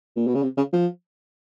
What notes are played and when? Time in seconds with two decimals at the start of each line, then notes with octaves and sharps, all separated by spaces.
0.16 A#2
0.27 B2
0.35 C#3
0.43 C3
0.57 C#3
0.73 F3